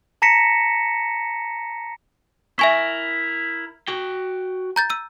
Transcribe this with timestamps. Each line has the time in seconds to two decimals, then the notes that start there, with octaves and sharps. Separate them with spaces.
0.22 A5 A#5 A#6 B6 C#7 E7
2.59 E4 A#4 E5 G#5 C#6
3.88 F#4 G5
4.76 A#5 G6 A6
4.90 E6 D#7